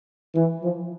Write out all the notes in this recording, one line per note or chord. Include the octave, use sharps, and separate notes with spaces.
E3
F3